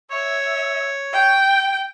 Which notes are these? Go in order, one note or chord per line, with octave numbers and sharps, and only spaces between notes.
C#5 E5
G5